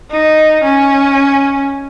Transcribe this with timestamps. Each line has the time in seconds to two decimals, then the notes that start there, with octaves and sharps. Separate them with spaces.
0.10 D#4
0.64 C#4